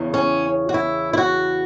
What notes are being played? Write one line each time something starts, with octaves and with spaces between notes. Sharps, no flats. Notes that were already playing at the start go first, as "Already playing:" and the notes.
Already playing: E2 C#3 E3
C#4
F#4
E4
E4
F#4